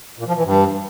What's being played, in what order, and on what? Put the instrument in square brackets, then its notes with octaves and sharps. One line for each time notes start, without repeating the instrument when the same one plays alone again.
[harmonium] A#2
F3
E3
G2